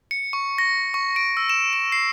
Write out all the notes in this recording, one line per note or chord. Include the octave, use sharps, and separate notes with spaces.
C#7
C#6
A#6
C#6
D7
E6
E7
E7
C7